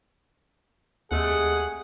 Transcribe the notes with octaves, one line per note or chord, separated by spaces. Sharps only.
D#2 C3 G#3 A3 G#4 F#5